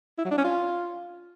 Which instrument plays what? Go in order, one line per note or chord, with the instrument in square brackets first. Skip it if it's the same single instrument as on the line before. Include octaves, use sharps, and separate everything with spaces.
[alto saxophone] E4
F#3
D4
C#4
F4